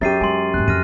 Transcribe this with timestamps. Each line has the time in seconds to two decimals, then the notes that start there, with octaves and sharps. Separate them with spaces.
0.01 F#2 C#4 G4 A6 C7 D#7
0.21 G#3 G#5 C6
0.54 F2 G#2 F#6
0.68 F2 F6 A#6 D#7